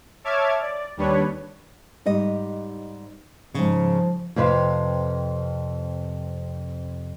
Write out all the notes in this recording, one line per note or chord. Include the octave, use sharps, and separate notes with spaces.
C#5 E5 A5 D6 F6 G#6
D5
D#2 G3 D4 B4 C#5
G#2 G3 D#5
G#2 C#3 F3
F2 C3 B4 C5 F5